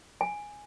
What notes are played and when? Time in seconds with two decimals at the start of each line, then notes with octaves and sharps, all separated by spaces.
0.21 G#5